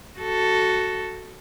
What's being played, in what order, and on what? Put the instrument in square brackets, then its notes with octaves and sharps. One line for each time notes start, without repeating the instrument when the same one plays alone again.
[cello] F#4 A4